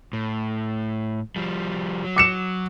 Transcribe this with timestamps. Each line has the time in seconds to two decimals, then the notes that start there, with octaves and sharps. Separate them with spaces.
0.13 A2
1.36 F3 G3
2.04 F#3
2.16 D6 C#7 E7